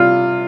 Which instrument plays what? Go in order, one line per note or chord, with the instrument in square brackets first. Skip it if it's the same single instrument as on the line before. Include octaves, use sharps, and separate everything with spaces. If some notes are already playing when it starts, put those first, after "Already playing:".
Already playing: [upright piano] C3 G3 F4